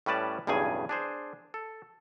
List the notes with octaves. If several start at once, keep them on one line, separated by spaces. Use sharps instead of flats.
A2 G3 C#4 B4 D5 A5
B1 E2 G2 C#3 G#4 G#5
D4 G#4 C5
A4